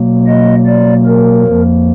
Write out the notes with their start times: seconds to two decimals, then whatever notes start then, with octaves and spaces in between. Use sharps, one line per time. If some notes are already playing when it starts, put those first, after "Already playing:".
Already playing: B2 F#3 A#3
0.27 D#5
0.66 D5
1.06 A#4
1.46 F2 F3 A#3